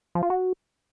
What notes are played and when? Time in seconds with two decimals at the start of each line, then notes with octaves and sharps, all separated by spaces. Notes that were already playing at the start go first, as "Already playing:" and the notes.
0.15 F3
0.23 F4
0.30 F#4